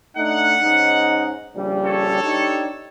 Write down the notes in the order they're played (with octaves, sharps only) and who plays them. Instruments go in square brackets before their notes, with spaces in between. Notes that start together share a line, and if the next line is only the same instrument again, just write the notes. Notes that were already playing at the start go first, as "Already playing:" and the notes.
[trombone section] A3 D4 D#4 [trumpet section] F#5
[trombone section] G#2 C#4 D#4
A#1 C#3 G3
[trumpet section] A4 C#5
[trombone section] D4 D#4 G4